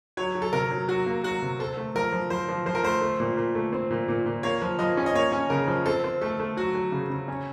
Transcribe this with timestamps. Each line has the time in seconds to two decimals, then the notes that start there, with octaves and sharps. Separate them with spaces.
0.17 F#3 C#5
0.35 F#3
0.42 A4
0.53 C3 A#4
0.71 F#3
0.88 F#3 F#4
1.06 A#3
1.24 F#3 F#4
1.42 C3
1.59 C4 A4
1.77 A3
1.95 F3 A#4
2.12 F3
2.30 F3 C5
2.49 F3
2.66 F3 C5
2.75 A#4
2.84 A3 C5
3.01 A3
3.20 A#2
3.37 A#2
3.55 A3
3.73 C4
3.90 A#2
4.08 A#2
4.26 A#2
4.43 A#3 C#5
4.62 F3
4.79 F3 D#5
4.97 C#4
5.06 D#5
5.15 A#3 C#5
5.32 C#4
5.50 C#3 A#4
5.68 F3
5.86 C4 A4
6.04 C4
6.21 A3 A4
6.39 A3
6.57 F#3 F#4
6.75 F#3
6.92 C#3
7.10 C#3
7.28 C#4